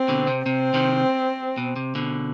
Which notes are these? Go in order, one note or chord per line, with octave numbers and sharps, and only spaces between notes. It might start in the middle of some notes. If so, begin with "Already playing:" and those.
Already playing: C4
B2 D3
C3
C3 C4
C3 D#3
B2
C3
B2 D3